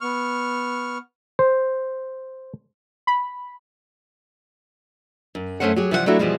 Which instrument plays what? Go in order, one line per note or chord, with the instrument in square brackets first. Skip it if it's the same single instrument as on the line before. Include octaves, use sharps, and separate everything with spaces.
[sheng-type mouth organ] B3 C#6 F6
[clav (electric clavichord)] C5
[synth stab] B5
[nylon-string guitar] F#2
F#2 F#3 A3 C#4 C5 F#5
F#3 G4 G#4
C3 E3 F3 G3 C#5 F#5
F#3 A3 D4 E4 F#4
B2 E3 F3 G3 G#3